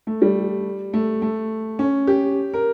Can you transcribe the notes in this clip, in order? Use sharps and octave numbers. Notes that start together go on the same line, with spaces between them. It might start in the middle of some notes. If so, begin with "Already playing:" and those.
A3
G3
A3
A3
C#4
G4
A#4